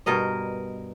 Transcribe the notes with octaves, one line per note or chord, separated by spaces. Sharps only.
G2 B2 A#4 D#5